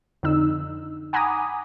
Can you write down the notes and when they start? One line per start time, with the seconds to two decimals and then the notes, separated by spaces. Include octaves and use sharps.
0.23 F2 D3 D#4 E6
1.13 F#5 G#5 A#5 B5 D6 D#6